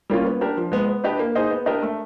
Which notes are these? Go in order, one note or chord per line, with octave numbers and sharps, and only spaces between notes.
G3 A#3 C#4 F4
B3
D4 G4 A#4
F3
G#3 B3
B3
D4 G4 B4 D#5
A#3
D#4 G#4 C5 D#5
B3
D4 G4 A#4 D#5
A3